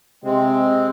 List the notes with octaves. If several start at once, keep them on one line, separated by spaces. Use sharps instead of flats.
C3 G#3 C4